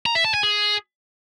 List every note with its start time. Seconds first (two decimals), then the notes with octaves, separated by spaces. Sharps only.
0.06 A#5
0.15 E5
0.25 A5
0.34 G#5
0.43 G#4